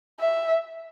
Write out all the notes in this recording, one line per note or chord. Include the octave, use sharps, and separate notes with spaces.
E5